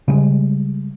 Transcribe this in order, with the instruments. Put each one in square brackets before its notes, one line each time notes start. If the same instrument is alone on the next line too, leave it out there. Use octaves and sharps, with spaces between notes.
[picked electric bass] C#3 G3 G#3